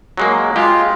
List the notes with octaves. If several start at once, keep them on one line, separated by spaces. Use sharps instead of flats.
F#3 G#3 A#3
G#3 F4 G4